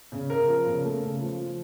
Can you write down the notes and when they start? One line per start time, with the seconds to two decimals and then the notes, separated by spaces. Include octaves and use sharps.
0.12 C#3
0.30 C#3 A#4
0.48 F3
0.66 C#3
0.84 A3
1.03 C#3
1.21 F3
1.39 F3